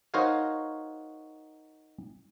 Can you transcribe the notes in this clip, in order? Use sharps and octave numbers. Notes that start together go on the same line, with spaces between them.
D#4 F#4 A#4 C5 C#5 F5